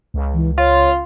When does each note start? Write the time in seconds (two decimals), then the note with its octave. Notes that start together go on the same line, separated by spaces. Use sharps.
0.14 C#2
0.34 E3
0.58 F4 C#5